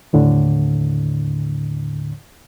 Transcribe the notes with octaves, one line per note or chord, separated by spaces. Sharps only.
D#2 A2 D3